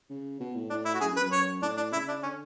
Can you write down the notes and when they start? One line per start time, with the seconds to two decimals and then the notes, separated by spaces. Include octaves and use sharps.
0.10 C#3
0.40 B2
0.55 A2
0.70 A2 D4
0.86 E4
0.95 F#4
1.01 F#2 G#4
1.11 F#2
1.17 B4
1.21 F#2
1.32 C#5
1.62 A2 D4
1.77 D4
1.93 C#3 E4
2.08 D4
2.23 D3 C#4